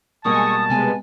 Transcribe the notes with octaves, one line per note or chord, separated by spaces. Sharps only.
B2 G3 G#3 A#3 G#5 A5 C#6 D#6
C3 G#3 B3 G#5